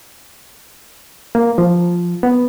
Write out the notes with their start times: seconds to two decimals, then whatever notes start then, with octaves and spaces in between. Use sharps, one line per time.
1.35 A#3
1.58 F3
2.23 B3